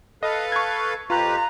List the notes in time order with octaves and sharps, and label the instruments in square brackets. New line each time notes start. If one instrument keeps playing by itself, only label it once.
[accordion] A4 B4 F5 [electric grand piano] D#5
[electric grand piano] C#6 G#6
[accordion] F2 G4 B4 [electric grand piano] F4 F#6 [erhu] A#5